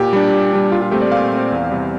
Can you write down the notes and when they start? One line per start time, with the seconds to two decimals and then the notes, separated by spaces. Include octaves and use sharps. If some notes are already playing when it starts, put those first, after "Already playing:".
Already playing: A#2 G4
0.13 G3 D4
0.32 A#2
0.53 G3 D4
0.71 A#2 F4
0.82 F4
0.91 A3 C4 G4
1.02 D5
1.12 A#2 F5
1.32 A3 C4
1.52 E2
1.71 C3 G3